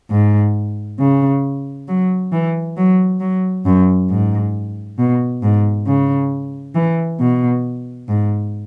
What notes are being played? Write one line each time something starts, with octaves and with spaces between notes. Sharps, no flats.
G#2
C#3
F#3
E3
F#3
F#3
F#2
G#2
B2
G#2
C#3
E3
B2
G#2